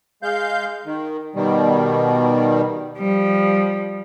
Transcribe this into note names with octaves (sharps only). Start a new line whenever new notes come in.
G#3 F5 G6
D#3
B2 D#3 G3
F3 G3